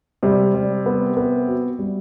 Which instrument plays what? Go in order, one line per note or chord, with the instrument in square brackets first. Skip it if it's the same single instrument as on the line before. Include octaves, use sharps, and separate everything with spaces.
[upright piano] C3 [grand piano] G3
[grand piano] G3
B3
B3
F#4
G3